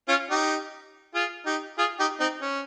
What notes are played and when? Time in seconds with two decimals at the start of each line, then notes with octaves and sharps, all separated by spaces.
0.08 C#4 F4
0.30 D#4 G4
1.15 F4 G#4
1.46 D#4 G4
1.78 F4 G#4
1.99 D#4 G4
2.20 C4 D#4
2.42 C#4